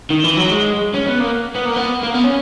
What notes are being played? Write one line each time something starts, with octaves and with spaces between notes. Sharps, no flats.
D#3
E3
F#3
G#3
C#4
B3
A#3
B3
A#3
B3
A#3
B3
C#4